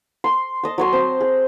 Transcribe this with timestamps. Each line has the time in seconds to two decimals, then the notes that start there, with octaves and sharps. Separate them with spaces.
0.24 C6
0.63 D#5 A5
0.78 F#3 C#5 C6
0.93 C4
1.21 G#4